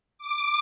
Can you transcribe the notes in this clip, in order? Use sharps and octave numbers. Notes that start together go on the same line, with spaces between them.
D6